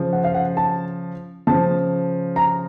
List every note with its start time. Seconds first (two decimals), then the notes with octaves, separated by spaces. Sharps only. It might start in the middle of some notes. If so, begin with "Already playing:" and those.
Already playing: C#3 F3
0.13 F#5
0.24 F5
0.35 F#5
0.57 A5
1.47 C#3 F3 A5
2.36 A#5